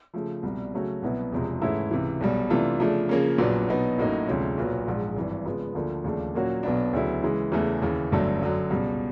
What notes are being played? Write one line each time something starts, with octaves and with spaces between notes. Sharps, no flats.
C#3 F3 A3
C2 B2 G3
C#3 F#3 A3 C#4 F#4
C2 B2 F#3 B3 E4
E1 E2 C3 F3 G#3
G#2 E3 A3 C#4 E4
C#2 C3 E3
B1 B2 G3
C3 E3 A3 D4 F4
C#3 F3 A3 D4
C#3 F3 A#3 C#4
A#1 A#2 F#3 B3 D4
B2 F#3 B3 D#4
A1 A2 F#3 A#3 D#4
D2 C3 F3 G#3 C#4
B1 A#2 F#3 B3
A#1 G#2 F3 G#3
G#1 G2 E3
C#3 F3 G#3 B3
D2 D3 F3 A#3
D#2 C#3 F3 A3 D4
A#2 F#3 A#3 C#4 F#4
B1 B2 F#3 B3 D4
D2 C#3 F#3 B3 E4
C#3 E3 G#3
E2 C#3 E3 A3
D#2 C#3 E3
G1 G2 D3 F#3 A3
F#2 D3 F#3
C#2 B2 G3